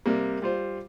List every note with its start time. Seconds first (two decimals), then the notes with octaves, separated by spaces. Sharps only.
0.06 C3 G3 A#3
0.42 G3 F4 C5